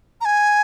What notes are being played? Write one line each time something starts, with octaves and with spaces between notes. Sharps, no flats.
A#5
G#5